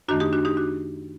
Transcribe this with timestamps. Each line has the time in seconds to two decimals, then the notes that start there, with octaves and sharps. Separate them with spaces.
0.08 F#2 D#3 A3 D4 F#4
0.20 D#4 G4
0.33 D4 F#4
0.45 D#4 G4
0.57 D4 F#4